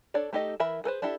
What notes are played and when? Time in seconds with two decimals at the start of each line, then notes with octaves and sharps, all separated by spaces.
0.14 D4 A4 C#5 D5
0.33 A3 D#4 G4 A4 D#5
0.60 E3 A#4 E5 B5
0.84 G#4 A4 B4 C5
1.02 D4 E4 G4 A4 E5